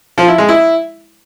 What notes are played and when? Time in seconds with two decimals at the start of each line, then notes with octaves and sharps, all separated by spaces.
0.18 F3
0.28 E4
0.38 G#3
0.49 E4